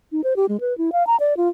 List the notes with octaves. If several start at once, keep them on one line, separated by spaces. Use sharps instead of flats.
D#4
C5
G4
G#3
B4
E4
F5
A#5
D5
F4